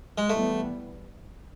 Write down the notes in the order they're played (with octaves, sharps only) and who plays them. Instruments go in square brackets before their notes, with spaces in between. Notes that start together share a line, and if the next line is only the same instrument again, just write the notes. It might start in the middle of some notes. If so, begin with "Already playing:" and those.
[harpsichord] G#3
[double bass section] E3 G3 B3 [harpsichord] A3